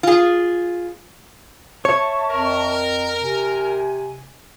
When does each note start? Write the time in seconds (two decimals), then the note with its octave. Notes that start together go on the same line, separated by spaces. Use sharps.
0.03 F4 G#4
1.85 C#5 E5 A5 C#6
2.31 F2 A#4
3.22 C3 G#5